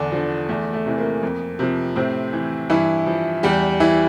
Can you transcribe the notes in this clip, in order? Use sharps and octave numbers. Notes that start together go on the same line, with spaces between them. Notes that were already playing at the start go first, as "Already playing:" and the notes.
Already playing: E2 D3 D4
D3 F3
E2 A3
A3
C3 E3
A#3
F2
C3 F3
A2 C3 C4
E3
G2 E3 E4
F3
E2 G3 G4
E3 E4